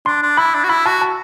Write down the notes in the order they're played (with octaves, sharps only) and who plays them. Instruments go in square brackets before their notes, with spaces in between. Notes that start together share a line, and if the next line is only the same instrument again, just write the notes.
[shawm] D4 [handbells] C6
[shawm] D4
[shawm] E4 [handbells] B5
[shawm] D4
F#4
[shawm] E4 [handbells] B5
[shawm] F#4 [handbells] A5
[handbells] A5